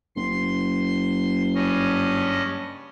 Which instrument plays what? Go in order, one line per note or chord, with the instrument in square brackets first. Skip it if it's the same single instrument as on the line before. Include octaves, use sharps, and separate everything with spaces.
[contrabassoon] F#1 [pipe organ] C6
[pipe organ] G2 C#4 D#5